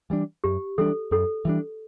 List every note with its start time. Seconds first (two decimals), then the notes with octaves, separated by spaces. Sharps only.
0.10 E3 G3 D4
0.44 F#2 G4
0.78 E3 G3 D4 A4
1.11 F#2 A4
1.45 E3 G3 D4